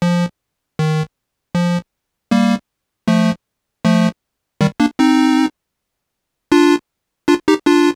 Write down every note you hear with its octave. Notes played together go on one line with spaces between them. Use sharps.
F3
D#3
F3
G3 A#3
F3 A3
F3 A3
D#3 G3
A#3 D4
C4 D#4
D4 F4
D4 F4
D#4 G4
D4 F4